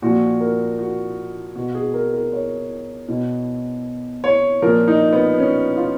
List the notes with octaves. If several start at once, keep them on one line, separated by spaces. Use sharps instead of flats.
A#2 F3 F#4
A#4
F#4
B2 F#4
G#4
A#4
A#4
C#5
B2
C#5
A#2 F3 A#4
D#4
B3
C#4
F4